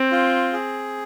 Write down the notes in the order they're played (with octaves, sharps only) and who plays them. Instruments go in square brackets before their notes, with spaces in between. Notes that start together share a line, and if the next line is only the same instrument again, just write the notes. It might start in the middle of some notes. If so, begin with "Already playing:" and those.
Already playing: [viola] C4
[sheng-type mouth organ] F4
G#4